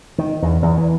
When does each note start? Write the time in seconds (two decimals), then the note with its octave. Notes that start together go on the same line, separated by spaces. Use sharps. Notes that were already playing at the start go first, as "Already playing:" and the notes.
0.18 D#3
0.42 E2
0.62 E2
0.78 E3